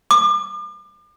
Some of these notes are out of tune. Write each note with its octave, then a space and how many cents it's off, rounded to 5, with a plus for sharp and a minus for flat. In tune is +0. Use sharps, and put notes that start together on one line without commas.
D6 +40